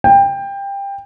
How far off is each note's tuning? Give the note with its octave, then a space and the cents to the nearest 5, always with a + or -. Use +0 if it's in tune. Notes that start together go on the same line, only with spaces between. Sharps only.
G5 +20